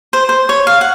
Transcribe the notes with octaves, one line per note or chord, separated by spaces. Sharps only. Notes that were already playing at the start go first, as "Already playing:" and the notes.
C5
C5
C#5
F5
F#5